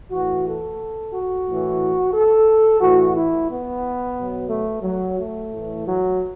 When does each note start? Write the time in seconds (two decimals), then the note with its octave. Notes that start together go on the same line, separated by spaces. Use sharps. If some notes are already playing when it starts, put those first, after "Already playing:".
0.11 A2 E3 F#4
0.45 A4
1.12 F#4
1.46 A2 E3
2.13 A4
2.80 A2 E3 F#4
3.14 E4
3.48 B3
4.15 B2 F#3
4.48 A3
4.82 F#3
5.16 A3
5.50 A2 E3
5.83 F#3